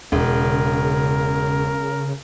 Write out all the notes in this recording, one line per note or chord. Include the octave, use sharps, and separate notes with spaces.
E1 C#3 A#4